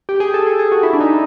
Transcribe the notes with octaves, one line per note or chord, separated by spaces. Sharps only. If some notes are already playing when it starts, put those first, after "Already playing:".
G4
G#4
A4
G#4
G#4
F#4
E4
D4
D#4